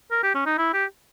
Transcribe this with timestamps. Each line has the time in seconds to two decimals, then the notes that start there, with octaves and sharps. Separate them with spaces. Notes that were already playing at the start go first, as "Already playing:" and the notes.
0.11 A#4
0.23 G4
0.35 C#4
0.46 D#4
0.58 E4
0.74 G4